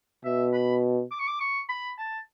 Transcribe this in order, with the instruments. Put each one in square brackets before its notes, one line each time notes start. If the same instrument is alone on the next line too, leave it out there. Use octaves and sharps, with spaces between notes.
[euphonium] B2 [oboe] E5
[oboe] B5
D6
C#6
D6
C#6
B5
A5